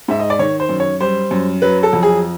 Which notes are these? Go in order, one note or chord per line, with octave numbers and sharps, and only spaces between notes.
G#2 E5
D#5
D5
D#3 C#5
C5
F#2
C#5
G3 C5
F#2
F#3 B4
A4
F2
G#4